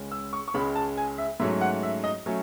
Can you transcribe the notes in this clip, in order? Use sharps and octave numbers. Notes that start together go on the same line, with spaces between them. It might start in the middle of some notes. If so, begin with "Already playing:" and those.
Already playing: C#2 C#3 G#3 C#4
E6
C#6
C#6
C#2 C#3 G#3 C#4 B5
A5
G#5
E5
G#2 F#3 A3 C#4 E5
F#5
E5
D#5
F#3 A3 C#4